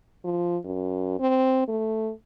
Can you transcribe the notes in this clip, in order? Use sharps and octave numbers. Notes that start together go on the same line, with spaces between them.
F3
F#2
C4
A3